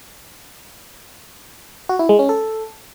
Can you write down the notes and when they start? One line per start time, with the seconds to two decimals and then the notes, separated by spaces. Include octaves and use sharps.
1.89 F#4
1.99 E4
2.09 G#3
2.19 C#4
2.29 A4